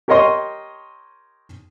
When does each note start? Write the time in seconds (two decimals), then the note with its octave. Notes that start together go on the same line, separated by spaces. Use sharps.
0.08 G4 A#4 C#5 D#5 C6 D#6